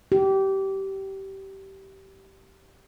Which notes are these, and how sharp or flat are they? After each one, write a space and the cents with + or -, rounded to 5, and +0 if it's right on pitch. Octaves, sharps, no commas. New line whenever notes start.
G4 -20